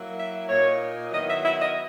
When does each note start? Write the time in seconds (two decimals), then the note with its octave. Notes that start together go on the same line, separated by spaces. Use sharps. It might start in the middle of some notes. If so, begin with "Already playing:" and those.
Already playing: F#3 A#3 E4
0.17 E5
0.49 A#2 A#3 D#4 C#5
1.12 D#3 F#3 B3 E4 D#5
1.28 E5
1.43 E5
1.59 D#5